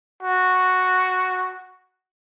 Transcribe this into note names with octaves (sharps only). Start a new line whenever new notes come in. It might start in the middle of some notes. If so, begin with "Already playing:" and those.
F#4